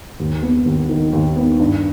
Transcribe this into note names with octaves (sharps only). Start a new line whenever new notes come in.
D#2
B3
D#2
D#3
D#2
B3
G2